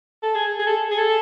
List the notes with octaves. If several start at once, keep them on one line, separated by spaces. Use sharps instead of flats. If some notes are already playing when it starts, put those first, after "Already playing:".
A4
G#4
G#4
A4
G#4
A4